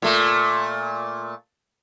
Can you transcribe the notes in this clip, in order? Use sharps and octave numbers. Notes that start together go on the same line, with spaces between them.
A#2 A3